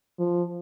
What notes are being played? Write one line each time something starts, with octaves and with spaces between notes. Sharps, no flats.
F3